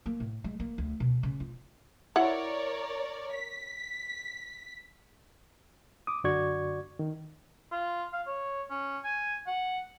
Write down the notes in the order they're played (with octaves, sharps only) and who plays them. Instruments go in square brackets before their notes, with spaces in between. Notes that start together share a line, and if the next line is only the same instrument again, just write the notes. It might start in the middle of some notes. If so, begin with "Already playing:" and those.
[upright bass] A#3
A2
G#3
A#3
D2
B2
C#3
F4
[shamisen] E4 F#5 [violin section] A#4 C#5 D5
[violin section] B6
[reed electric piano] D6 D#6
F#2 D3 F#4 D5 C#6 G#6
D#3
[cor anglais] F4
F5
C#5
C#4
G#5
F#5